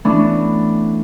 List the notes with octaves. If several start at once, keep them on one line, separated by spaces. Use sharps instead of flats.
E3 A3 B3 C#4 D4